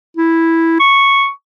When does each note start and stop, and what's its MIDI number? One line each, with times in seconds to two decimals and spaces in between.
0.17 0.79 64
0.80 1.30 85